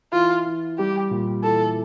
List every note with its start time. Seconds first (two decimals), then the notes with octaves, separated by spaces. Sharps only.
0.12 E3 F4
0.46 E3
0.78 G3 G4
1.11 A#2
1.44 E3 A4